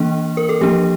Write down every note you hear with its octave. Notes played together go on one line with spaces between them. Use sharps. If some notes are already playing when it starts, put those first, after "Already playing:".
Already playing: E3 A#3 D4
A#4
A4
F3 A#3 D4 G4